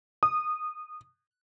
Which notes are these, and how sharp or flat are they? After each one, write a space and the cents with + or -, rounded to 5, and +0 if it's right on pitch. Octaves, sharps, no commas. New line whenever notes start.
D#6 -20